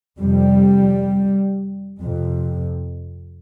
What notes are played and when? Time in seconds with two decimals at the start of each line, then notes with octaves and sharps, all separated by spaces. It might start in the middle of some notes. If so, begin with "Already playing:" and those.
0.20 F2 C3 G3
2.01 F2 C3